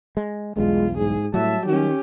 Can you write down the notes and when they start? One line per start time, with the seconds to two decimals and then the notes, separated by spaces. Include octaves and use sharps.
0.17 G#3
0.57 B1 E2 G2 G#3 F4
0.97 G#2 G#4
1.34 A2 F#3 G3 E5 A5
1.66 D#3 C#4 G4